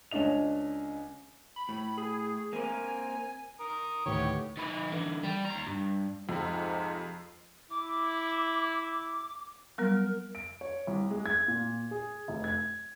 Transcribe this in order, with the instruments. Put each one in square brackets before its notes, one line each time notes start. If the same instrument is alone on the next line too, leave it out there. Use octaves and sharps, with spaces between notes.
[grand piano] C#2 C#4 D4 D#5 F7
[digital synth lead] B5
[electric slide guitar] A2
[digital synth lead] G#4
[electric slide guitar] A#3 C4 A#4 [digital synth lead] G#5
[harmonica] A#4 D#6
[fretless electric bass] D2 A2 D#3 [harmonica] B3 G4 C#5
[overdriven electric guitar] D#3 B4
D3 E3
G3
D#2 A#5
G2
[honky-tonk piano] F2 [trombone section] G#2 C3
[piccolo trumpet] E4 [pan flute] D6
[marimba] F#3 G3 B3 [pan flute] A#4
[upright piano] D7
C#5
C2
G#3
G#6
A#2
G#4
F1
G#6